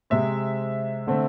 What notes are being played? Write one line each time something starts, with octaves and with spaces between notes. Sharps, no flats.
C3 G#3 C4 E5
D3 A3 C4